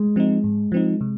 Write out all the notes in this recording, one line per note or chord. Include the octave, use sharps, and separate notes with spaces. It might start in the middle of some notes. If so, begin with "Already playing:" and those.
Already playing: G#3
F3 C4 D#4
G#2
F3 C4 D#4
C3